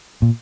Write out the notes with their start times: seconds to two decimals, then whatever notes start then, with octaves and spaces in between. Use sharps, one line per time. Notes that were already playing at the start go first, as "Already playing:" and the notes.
0.22 A#2